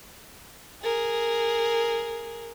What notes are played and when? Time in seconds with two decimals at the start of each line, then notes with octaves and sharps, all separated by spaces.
0.83 G#4 A#4